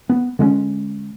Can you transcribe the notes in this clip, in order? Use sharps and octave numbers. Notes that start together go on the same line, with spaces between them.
B3
D3 G#3 A#3 C#4